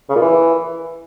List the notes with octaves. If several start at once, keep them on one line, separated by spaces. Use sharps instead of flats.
C#3
A#2
E3